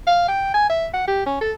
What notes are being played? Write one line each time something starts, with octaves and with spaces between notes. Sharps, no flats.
F5
G5
G#5
E5
F#5
G4
C#4
A4